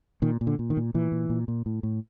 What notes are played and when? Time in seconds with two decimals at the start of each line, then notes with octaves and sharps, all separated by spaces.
0.22 A#2 D#3
0.41 A#2
0.47 D3
0.59 A#2
0.70 D#3
0.77 A#2
0.94 A#2 E3
1.12 A#2
1.30 A#2
1.48 A#2
1.66 A2
1.83 A2